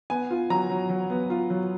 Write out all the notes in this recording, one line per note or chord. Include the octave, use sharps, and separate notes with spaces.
B3 G#5
F4
F#3 A#5
F#3
F#3
B3
F4
F#3